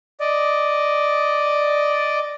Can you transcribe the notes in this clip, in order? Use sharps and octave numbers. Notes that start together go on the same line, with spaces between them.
D5 D#5